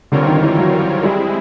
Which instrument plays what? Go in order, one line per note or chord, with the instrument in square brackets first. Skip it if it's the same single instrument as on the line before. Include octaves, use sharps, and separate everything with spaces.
[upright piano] D3 [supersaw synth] G3 C4 F4 A#4 C#5
[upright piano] D#3
D#3
E3
F#3
[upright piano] G3 [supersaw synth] G#3 C4 E4 G#4